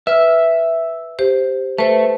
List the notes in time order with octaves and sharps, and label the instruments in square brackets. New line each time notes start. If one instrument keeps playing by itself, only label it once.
[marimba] B4 F6 [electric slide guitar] E5
[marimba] G4 C5
[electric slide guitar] A3 [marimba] B4 C5